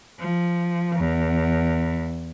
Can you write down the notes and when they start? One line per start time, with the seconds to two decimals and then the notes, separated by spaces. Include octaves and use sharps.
0.19 F3
0.96 E2